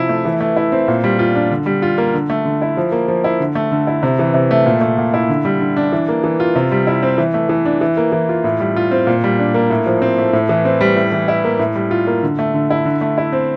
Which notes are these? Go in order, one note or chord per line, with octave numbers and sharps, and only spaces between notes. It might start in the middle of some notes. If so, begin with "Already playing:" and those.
Already playing: C3 F3 E4
A3
E3
A3
E4
C4
A#2
G3
F4
D4
D3
G3
F4
A#3
D3
A3
D3
E4
F3
A#3
F3
E4
D3
A3
D3
E4
C3
E3
C3
A3
A#2
A3
A#2
E4
D3
G3
D3
D4
E3
A#3
E3
F4
C3
G3
E4
C4
E3
A3
E3
D4
E3
A#3
E3
F4
A2
G3
F4
C4
A#2
G3
D4
A#3
A2
F3
C4
A3
A2
E3
C4
G3
A2
E3
E4
A#3
A2
G3
F4
A#3
D3
A3
D3
E4
D3
A3
E4
C4